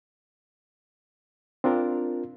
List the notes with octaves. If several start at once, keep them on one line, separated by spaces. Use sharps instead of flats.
C4 D4 F4 A#4